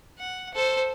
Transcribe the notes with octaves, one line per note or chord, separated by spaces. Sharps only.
F#5
A4 C5